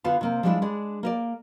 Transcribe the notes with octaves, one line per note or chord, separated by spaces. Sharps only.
D3 B3 F4 B4 F5 A5
C3 A#3 C4
F3 G3 G#3 A#3 D4 E4
G#3 D4
A#3 A#4 D5